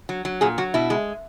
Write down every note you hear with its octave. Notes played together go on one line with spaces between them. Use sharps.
F#3
F#3
A#2 G#4
F#3 F#4
B2 E4
G#3